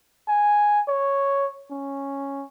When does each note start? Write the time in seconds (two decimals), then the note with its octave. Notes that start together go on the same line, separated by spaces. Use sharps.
0.28 G#5
0.88 C#5
1.71 C#4